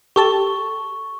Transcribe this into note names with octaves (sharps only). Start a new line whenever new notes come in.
G4 A4 A5 C#6